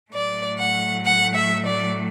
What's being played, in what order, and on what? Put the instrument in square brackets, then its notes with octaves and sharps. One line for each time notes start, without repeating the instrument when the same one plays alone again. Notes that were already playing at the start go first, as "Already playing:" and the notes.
[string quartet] A2 F#3 A3 D5
F#5
F#5
E5
D5